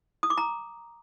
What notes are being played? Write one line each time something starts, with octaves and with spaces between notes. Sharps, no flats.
D#6
D6
A#5